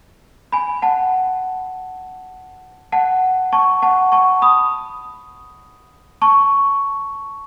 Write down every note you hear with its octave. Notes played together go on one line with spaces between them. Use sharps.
G#5 B5
F#5 A5
F#5 A5
A5 C#6
F#5 A5
A5 C#6
B5 D#6
A5 C#6